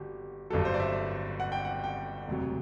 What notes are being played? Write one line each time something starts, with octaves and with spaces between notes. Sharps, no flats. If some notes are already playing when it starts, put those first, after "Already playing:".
Already playing: G1 F#4 G4
G1 G2 F#3 A4
C5
D5
E5
F#5
G5
F#5
G5
E1 D2 C3 F#3